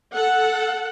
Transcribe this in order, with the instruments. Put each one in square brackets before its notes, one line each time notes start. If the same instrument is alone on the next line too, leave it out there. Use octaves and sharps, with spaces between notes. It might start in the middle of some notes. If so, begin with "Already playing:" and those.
[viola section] A4 F#5